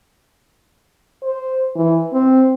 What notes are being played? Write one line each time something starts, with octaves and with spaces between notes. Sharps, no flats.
C5
E3
C4